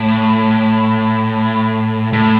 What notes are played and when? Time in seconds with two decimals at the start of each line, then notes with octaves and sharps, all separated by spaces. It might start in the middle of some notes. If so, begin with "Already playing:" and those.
Already playing: A2
2.13 A2